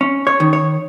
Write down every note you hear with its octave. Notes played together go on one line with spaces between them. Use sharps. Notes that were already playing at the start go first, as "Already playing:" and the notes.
C#4
C#5
D#3
C#5